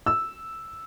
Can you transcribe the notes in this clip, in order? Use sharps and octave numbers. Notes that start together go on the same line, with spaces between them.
E6